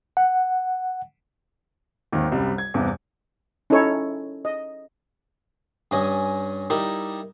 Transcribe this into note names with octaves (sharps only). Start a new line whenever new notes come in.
F#5
G#1 D#2 D#3
C2 F#2 G3
G#6
E2 G2 C3 B3
C#4 D#4 E4 A4 C#5
D#5
G2 C#4 D#5 G#5
G3 D#4 E4 A#4